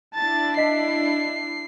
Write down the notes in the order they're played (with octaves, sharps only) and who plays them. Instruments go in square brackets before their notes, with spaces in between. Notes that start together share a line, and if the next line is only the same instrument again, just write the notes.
[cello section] D4 E4 [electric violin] A5 A6
[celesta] D#5 B6 [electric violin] C7